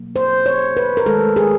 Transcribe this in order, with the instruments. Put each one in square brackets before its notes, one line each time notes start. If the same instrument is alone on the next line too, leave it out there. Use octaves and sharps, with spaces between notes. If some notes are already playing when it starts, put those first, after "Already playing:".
Already playing: [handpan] B2 F#3 A#3
C5
C#5
B4
A#4
D#3 G#3 A4
G#4